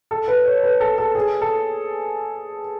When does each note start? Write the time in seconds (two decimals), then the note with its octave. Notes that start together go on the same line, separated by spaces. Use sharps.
0.11 A4
0.28 B4
0.45 C#5
0.63 B4
0.80 A4
0.98 A4
1.15 G#4
1.41 A4